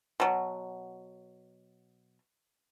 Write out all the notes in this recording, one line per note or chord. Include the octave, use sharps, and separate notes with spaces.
B2 F#3